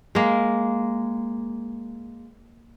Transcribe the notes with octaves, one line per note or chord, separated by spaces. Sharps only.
G#3 A#3